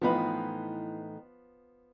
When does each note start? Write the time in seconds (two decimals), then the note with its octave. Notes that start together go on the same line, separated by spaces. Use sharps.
0.02 A2 E3 F3 B3 D#4 B5